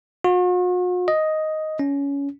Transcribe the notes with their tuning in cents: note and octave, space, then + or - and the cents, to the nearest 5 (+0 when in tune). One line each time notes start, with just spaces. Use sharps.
F#4 -45
D#5 +5
C#4 +20